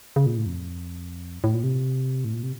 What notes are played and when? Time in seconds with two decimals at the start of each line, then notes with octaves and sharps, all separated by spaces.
0.16 C#3
0.26 A#2
0.37 A2
0.46 F2
1.44 A2
1.54 A#2
1.64 C3
2.25 A2
2.34 A#2
2.43 C3